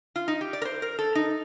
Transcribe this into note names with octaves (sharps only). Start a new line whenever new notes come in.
F4
D#4
G4
D5
A#4
C5
A#4
A4
D#4